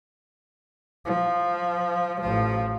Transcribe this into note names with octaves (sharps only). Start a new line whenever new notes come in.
F3
A1 F3